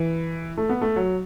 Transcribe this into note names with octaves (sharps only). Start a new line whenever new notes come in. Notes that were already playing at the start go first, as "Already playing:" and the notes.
Already playing: E3
A3
B3
A3
F#3